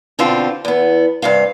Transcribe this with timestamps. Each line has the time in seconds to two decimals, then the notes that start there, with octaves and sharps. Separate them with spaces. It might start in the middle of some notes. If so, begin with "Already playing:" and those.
0.19 B2 D3 C4 D4 F4
0.65 E2 B3
1.22 G2 C3 F5